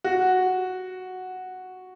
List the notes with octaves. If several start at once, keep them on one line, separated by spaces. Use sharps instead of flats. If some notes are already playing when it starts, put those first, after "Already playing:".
F#4